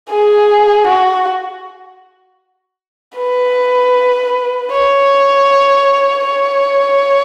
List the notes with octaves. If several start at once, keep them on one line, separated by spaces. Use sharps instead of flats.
G#4
F#4
B4
C#5
C#5